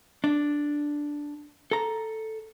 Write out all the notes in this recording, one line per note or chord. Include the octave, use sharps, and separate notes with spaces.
D4
A4 A#5